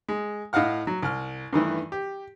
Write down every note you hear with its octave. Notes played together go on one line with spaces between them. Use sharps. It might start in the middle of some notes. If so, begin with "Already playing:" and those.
G#3
A2 D#5 F5 F#5 F6
F#3
C2 F6
G2 D#3 E3 A3
G4